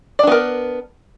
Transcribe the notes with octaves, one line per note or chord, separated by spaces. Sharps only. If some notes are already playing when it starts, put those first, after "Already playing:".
B3 D4 A#4 D5